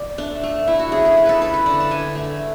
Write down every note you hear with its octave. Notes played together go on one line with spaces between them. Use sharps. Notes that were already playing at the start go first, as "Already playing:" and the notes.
Already playing: D5
A3 D4
A3
A3 E4
F#4
C#3 G#4
G#4
C#3 G#4
A4 B4
A3 B4
A4
D3 D5
A5
D3 G#5
A3